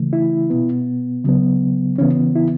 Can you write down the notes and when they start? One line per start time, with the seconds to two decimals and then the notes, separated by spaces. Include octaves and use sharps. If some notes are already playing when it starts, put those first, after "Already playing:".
Already playing: C#3 E3 A3
0.13 E4
0.50 B2 B3
1.24 C#3 F#3 B3
1.98 C#3 E3 B3 C#4
2.36 E4